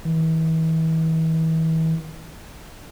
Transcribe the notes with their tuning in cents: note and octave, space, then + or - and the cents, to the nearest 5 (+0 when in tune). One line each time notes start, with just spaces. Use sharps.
E3 -40